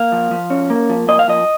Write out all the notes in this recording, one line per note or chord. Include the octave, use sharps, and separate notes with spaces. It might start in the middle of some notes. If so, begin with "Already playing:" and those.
Already playing: A#3 F5
F3
F3
C#4
A#3
F3
A#3 D#5
F5
F3 D#5